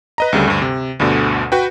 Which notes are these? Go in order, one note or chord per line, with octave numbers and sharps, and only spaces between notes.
B4 D#5 A#5
D2 C#3 G3 A3
D2 G2
C3
D2 G2 B2 D3
F#4 B4 G5